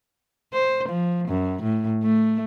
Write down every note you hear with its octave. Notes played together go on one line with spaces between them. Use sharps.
C5
F3
F#2
A2
A3